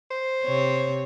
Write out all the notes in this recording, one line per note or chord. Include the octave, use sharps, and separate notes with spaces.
C5
C3 C#5